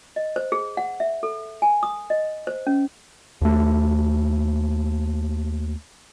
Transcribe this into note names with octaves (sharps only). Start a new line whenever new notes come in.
D#5
C5
G#4
F#5
E5
A4
G#5
D#6
D#5
C5
C#4
D#2 A3